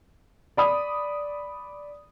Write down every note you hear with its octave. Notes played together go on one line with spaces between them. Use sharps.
D5 B5 D#6